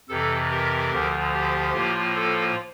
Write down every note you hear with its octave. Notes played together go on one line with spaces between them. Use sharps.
F2 C3 E3 A4
G4 A#4
D2 D3 F3
G4
A2 F3 A#3 F4
A4